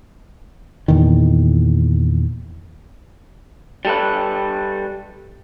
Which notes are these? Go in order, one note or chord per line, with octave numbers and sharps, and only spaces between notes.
E2 A#2 D#3
G3 A4 B4